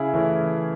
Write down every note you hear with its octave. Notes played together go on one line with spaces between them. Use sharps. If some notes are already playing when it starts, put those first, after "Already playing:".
Already playing: C#3 E4 G#4
E3 A3 C#4